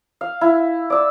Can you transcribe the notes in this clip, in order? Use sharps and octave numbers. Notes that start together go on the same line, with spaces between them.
F5
E4
D5 E6